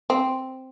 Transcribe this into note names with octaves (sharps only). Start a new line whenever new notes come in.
C4